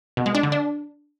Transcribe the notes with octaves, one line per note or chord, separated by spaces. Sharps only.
B2
G#3
D4
D3
D4